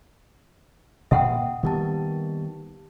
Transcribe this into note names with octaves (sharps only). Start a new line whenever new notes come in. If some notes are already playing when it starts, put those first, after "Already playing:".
A#2 E5 F#5 G5 D#6
D#3 G3 A#3 B3 G4 A5